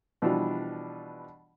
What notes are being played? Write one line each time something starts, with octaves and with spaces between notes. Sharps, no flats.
B2 E3 F3 G3 D4